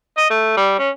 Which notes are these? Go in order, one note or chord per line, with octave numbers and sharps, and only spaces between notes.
D#5
A3
G3
C#4